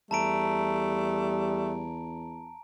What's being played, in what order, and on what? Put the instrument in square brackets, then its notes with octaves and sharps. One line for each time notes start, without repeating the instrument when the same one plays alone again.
[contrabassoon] E2 [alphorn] G3 [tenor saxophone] A3 [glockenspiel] A5 A#5 D7